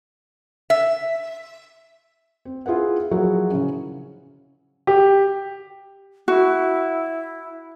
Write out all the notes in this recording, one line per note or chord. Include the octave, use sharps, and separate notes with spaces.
E5
C4
E4 F4 G#4 B4 F#5
F3 F#3 E4 F#4 G#4 A#4
C#3 C#4
G4
E4 F#4